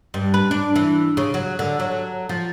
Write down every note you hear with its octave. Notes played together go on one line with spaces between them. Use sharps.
G2
B4
D4
E3
C#3
F#3
D3
F#3
F3